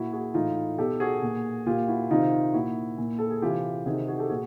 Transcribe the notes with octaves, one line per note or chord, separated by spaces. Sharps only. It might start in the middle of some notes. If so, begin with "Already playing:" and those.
Already playing: A#2 E4 F#4
F#4 G#4
A2 E3 D#4 F4
B2 G4 A4
F#4 G#4
A#2
A#2 F4 G4
E4 F#4
C3 D#3 D#4 F4
A#2 E4 F#4
A#2
A4
G#4
C3 E3 F4 G4
C3 D#3 F#4 G#4
F#4 G#4
G4 A4
A#2 F#4 G#4